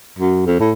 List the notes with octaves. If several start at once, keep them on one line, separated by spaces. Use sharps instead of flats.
F#2
F2
A2